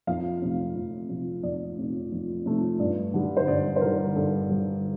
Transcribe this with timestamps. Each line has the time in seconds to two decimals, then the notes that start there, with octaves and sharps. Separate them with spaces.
0.07 F2 F5
0.42 C3 F3 A3
0.76 F2
1.10 C3 F3 A3
1.43 F2 D5
1.78 C3 F3 A3
2.12 F2
2.46 C3 F3 A3
2.80 G2 D5
3.14 D3 G3
3.37 C5
3.48 G2 D5
3.76 C5
3.81 D3 G3 A#4
4.16 G2 A4
4.50 D3 G3